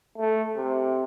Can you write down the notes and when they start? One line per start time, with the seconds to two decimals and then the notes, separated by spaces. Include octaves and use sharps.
0.18 A3
0.56 C3